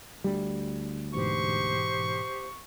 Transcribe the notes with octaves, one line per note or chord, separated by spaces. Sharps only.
D2 G3
G#2 B2 E3 G4 C5 C#6